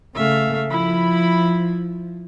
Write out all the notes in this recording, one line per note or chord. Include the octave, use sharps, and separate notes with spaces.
C#3 A3 E5 F5
F3 E4 B5